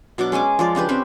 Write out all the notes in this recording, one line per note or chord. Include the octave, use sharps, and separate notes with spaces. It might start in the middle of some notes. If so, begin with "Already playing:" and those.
B2 F#3 D4 D6
G#3 C#4 G#5 D6
F3 G#3 D5
C#3 D4 G4 B4
C4 C#4 B4